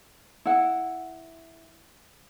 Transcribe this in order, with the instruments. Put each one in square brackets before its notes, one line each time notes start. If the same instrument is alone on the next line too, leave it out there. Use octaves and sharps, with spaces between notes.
[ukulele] E4 F#5